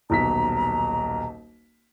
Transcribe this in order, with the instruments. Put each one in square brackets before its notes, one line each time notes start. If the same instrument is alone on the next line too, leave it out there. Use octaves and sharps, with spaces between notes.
[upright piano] D#1 B1 B6 [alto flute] A#5